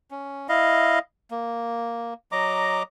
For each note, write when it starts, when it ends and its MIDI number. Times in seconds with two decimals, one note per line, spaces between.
0.11 0.47 61
0.49 0.99 64
0.49 0.99 75
0.49 0.99 77
1.31 2.14 58
2.32 2.83 54
2.32 2.83 75
2.32 2.83 82
2.32 2.83 86